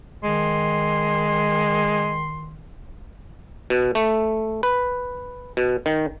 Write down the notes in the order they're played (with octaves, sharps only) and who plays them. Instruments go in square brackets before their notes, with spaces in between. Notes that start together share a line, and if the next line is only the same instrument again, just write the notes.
[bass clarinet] D#3 [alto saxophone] G#3 [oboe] C6
[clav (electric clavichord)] B2
A3
B4
B2
D#3